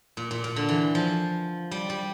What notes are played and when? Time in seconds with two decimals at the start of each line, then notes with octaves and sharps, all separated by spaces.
0.17 A#2
0.31 A#2
0.44 A#2
0.56 D3
0.69 E3
0.95 F3
1.71 G3
1.90 G3